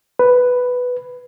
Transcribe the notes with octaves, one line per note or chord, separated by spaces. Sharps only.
B4